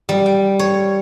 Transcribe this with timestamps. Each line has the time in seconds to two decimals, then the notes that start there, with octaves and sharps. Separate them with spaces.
0.09 G3
0.26 G5
0.59 C#5